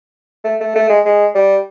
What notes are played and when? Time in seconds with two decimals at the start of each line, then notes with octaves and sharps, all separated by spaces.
0.45 A3
0.60 A3
0.76 A3
0.89 G#3
1.05 G#3
1.35 G3